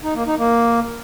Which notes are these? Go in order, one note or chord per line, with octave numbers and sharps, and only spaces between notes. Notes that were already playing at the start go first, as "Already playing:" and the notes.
D#4
A#3
D#4
A#3